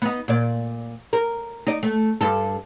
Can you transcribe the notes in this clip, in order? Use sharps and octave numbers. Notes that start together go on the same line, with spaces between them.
B3 D#4
A#2 D5
A#4
D#4 D5
A3
G2 A4